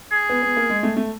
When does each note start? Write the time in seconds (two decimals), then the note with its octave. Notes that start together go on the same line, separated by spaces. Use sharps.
0.12 G#4
0.29 B3
0.42 B3
0.57 A#3
0.70 G#3
0.83 A3
0.96 A3